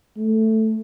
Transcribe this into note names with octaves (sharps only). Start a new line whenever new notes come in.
A3